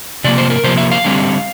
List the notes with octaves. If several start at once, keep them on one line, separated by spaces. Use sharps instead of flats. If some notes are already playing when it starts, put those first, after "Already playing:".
C3 F3 A#3 D5
C5
A#4
C3 F3 A#3 C5
E5
F5
D3 G3 C4